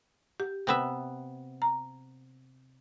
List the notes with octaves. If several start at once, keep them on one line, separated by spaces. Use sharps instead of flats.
G4
C3 B3 E5
A#5